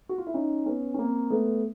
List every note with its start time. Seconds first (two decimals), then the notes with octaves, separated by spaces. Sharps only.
0.09 F#4
0.18 F4
0.27 E4
0.34 C#4 D#4
0.66 B3 C#4
0.94 C#4
0.98 A#3 C4
1.30 A3 B3